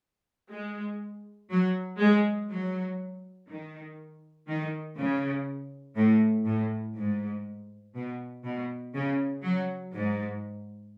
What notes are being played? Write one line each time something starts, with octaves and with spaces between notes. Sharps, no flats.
G#3
F#3
G#3
F#3
D#3
D#3
C#3
A2
A2
G#2
B2
B2
C#3
F#3
G#2